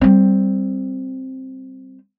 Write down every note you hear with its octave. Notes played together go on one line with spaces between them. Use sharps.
G3 C4